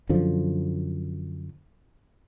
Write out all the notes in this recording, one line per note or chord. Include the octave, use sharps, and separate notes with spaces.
F#2 D3 F3